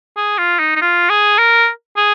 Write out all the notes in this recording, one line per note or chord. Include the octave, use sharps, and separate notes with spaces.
G#4
F4
D#4
D#4
F4
G#4
A#4
G#4